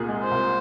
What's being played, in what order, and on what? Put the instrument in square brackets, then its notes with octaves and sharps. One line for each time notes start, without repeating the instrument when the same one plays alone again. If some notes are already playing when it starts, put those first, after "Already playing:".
Already playing: [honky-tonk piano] C2 A#2 G#4
G#3
[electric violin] C5
[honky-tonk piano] C2